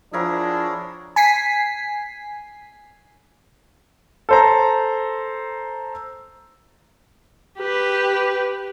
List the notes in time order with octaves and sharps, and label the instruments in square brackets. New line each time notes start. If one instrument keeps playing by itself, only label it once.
[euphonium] F3 [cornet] D4 [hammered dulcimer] E4 A#4 F#5 [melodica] G#4 C#5
[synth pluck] G#5 B6 C7
[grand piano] A4 C5 A#5
[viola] G4 B4